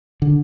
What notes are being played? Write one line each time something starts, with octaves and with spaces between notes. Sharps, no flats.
D3